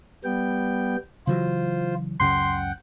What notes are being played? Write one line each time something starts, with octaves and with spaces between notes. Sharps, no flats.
G3 B3 G5
C#3 E3 F#3 F4 C5
C#2 F#2 C#3 F#5 G5 C6